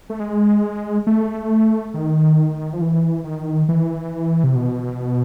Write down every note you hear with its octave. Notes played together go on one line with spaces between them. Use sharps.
A3
G#3
A3
D#3
F3
E3
D#3
E3
C3
B2